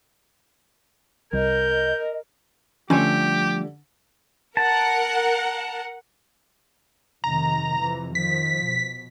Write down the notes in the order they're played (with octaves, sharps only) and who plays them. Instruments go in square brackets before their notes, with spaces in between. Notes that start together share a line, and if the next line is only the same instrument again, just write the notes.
[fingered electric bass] C2 [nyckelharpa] A#4 [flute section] D#5 [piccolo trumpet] G6
[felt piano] D3 [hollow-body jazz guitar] F3 G3 A3 [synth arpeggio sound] C#4 G#5 [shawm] G4
[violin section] A#4 F#5 [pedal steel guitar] A5
[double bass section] F1 C3 D#3 [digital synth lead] A#5
[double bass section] F2 C3 E3
[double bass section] D#3 F3 [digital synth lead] B6
[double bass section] B2